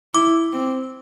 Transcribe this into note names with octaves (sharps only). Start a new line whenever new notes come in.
E4 D6
C4